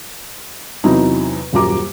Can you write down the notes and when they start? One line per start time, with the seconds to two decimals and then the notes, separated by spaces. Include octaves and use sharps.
0.84 E2 C3 F#3 D#4 E4
1.53 D#1 F#2 F#4 A#5 D6